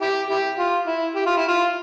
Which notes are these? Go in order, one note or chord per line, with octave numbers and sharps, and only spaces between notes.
E4 G4
E4 G4
F4
E4
G4
F4
E4
F4